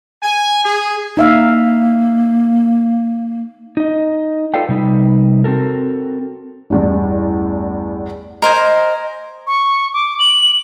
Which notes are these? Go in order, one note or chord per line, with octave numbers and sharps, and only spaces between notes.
G#5
G#4
A#3 D#4 E5 F5
D#4 D#5
F4 A4 B4 D5 F5 G5
C3 G3 D#4 B4
C4 F#4 A4 A#4
A1 E2 G2
A#4 C5 D#5 G#5
D#5
C#6
D6
F#7